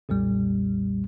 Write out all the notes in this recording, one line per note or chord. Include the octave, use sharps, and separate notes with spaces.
B1 F2 A#2 G3